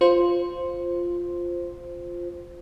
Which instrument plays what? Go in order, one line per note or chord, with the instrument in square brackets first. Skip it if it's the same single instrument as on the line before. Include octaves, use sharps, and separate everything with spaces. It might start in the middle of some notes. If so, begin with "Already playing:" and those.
[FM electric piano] F4 C5